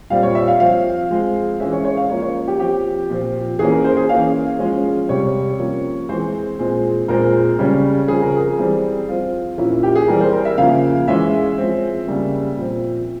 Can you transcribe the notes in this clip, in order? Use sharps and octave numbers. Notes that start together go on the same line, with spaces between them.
A#2 G3 C4 F5
C#5
E5
F5
F3 C4 F5
F3 G#3 C4
E3 G#3 C#4 E5
C#5
C#5
F5
F3 A#3 C#4 C#5
C#5
G4
F3 C4 G4
A#2 F3 C4
E3 A#3 C#4 G#4
A#4
C5
G#4
E3 A#3 C#4 F5
F3 G#3 C#4
C3 G3 C4 C#5
F3 A#3 C#4
E3 G#3 C4 C5
A#2 G#3 C4
A#2 G#3 C4 A#4
C#3 G3 C#4
C#3 F3 C4 G#4
A#4
G#4
E3 G3 C4
F3 C4 F4
A#2 F3 A#3 C#4 E4
E4
G4
G#4
E3 G3 C4 A#4
C5
A#4
E5
C#3 F3 A#3 F5
E3 G#3 C#4 E5
F3 G#3 C4
C#3 G3 A#3
A#2 F3 C4